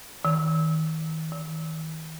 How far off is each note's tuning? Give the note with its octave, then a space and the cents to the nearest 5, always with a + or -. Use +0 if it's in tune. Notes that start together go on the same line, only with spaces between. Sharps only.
D#3 +35
D#3 +35